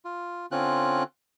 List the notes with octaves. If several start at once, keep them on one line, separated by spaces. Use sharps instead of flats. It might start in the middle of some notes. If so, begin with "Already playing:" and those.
F4
D3 C4 C#4 F4 F#6